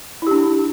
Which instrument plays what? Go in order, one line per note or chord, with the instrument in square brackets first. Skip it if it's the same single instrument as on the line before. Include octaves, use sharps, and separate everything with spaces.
[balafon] E4
G4
D4